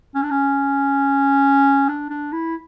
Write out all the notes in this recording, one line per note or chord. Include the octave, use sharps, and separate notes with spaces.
C#4
D4
C#4
D4
D4
E4